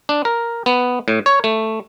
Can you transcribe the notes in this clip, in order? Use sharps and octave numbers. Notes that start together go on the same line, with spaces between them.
D4
A#4
B3
A2
C#5
A3